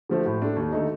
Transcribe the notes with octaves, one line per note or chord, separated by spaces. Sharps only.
D3 F3 A3
A2
A3 D4
D#2
D3 A3 D#4